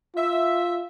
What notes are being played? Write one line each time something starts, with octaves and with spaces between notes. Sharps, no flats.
F4 E5